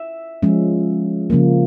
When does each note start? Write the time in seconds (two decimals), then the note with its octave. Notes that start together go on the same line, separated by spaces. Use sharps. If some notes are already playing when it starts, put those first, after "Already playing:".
Already playing: E5
0.42 F3 G#3 C#4
1.30 C#3 F3 A#3